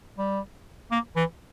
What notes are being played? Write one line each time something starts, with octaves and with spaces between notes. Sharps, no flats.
G3
A#3
E3